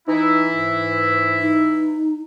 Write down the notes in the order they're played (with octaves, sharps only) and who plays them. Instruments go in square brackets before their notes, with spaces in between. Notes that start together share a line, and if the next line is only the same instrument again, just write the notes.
[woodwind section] E3 E4 [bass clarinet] D#4
[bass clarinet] G#2
[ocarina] D#4